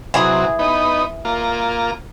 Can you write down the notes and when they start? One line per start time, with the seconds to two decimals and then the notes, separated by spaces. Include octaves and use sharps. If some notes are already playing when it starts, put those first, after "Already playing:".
0.14 C3 E3 F#3 G#4
0.59 B3 D#4
1.25 A#3 F4